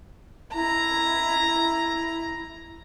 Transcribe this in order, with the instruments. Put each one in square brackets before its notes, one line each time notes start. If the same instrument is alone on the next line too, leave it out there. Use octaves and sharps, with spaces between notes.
[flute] E4 [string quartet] A#5